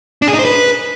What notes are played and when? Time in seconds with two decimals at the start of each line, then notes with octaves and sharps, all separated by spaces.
0.22 D4
0.28 G#4
0.33 D#4
0.39 C5
0.45 B4